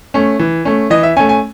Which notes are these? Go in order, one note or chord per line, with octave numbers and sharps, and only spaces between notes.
A3 C#4
E3
A3 C#4
E3 D#5
E5
A3 C#4 G#5
G#5